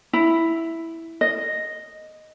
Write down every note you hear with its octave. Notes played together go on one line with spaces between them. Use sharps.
E4
D#5